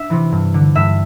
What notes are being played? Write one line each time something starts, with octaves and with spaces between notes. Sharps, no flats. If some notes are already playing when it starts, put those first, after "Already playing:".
Already playing: D4 E5
C3 E3
G2
D3
G2 E5